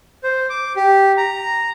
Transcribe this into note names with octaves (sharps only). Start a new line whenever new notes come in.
C5
D6
G4
A#5